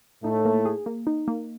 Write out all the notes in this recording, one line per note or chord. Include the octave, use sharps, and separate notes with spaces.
A2 A3 D#4
A#3
G#4
A#3
D#4
A#3